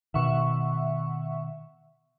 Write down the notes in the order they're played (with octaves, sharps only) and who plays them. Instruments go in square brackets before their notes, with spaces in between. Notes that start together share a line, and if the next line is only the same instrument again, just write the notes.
[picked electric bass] B2 D#3 [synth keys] E5 F#5 C#6